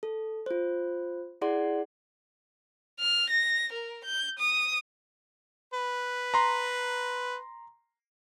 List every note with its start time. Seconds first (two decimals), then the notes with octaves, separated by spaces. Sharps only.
0.03 A4
0.46 F4 C5
1.41 E4 G#4 D5 F#5 C6
3.00 F6
3.30 A#6
3.73 A#4
4.05 G6
4.39 D#6
5.73 B4
6.34 A#5 C6